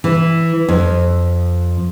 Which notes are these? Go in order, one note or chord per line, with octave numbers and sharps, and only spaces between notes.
E3
F2